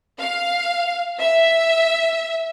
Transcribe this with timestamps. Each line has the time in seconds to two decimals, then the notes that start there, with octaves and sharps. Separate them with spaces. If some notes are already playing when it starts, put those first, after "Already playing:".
0.19 F5
1.20 E5